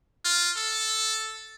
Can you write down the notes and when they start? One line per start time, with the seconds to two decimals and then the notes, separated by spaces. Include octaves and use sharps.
0.24 F4
0.56 A4